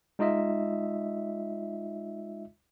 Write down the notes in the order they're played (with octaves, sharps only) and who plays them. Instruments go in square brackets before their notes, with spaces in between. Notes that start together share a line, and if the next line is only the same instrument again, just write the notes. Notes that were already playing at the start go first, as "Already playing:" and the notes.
[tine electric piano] G#3 D#4 F4 D#5 E5